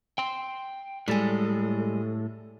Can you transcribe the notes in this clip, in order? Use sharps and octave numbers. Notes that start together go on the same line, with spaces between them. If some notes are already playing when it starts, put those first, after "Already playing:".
G5 C6
A2 G3 G#3 A4